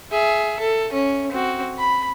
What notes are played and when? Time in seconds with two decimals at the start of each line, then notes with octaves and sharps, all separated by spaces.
0.11 G#4 E5
0.59 A4
0.92 C#4
1.32 C4 F#4
1.78 B5